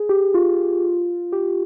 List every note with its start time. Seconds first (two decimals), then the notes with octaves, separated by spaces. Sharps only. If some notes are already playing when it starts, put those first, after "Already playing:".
Already playing: G#4
0.09 G4
0.34 F4
1.32 G4